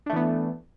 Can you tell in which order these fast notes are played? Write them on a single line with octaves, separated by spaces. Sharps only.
D4 A3 E3 B3